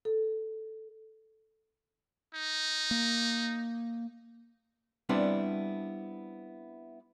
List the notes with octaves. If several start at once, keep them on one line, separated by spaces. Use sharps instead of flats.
A4
D#4
A#3
G3 B3 C4 D4 E4